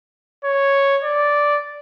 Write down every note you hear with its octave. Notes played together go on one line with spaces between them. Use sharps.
C#5
D5